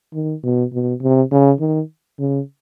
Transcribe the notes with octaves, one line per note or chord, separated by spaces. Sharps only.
D#3
B2
B2
C3
C#3
D#3
C#3